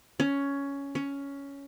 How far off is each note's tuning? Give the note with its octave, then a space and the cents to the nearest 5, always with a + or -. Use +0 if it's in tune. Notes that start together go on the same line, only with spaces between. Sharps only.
C#4 +10
C#4 +10